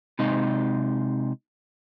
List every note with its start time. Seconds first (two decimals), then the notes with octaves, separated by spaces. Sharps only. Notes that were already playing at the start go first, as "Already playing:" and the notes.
0.19 C3 G#3 D#4 D#5